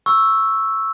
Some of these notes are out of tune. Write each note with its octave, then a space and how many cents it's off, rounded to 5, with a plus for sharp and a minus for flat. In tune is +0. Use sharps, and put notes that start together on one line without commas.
C#6 -5 E6 +0